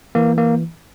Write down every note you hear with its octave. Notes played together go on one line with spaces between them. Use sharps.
E3 A#3
A#3